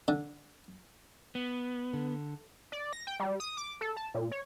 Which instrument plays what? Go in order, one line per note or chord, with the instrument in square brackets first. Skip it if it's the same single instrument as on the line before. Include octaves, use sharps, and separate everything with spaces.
[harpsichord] D3
[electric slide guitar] B3
[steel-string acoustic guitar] D3
[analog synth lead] D5
A#6
G5
G3
D#6
D6
A4
A5
A#2
C#5